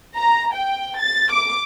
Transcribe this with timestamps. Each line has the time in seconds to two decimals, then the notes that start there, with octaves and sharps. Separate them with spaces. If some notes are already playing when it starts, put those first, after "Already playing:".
0.18 A#5
0.54 G5
1.00 A6
1.32 D6